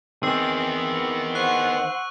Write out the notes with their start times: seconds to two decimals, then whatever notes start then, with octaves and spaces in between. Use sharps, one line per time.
0.23 D#3 B3 C4 G#4 E6
1.35 C5 F#5 C#6 F#6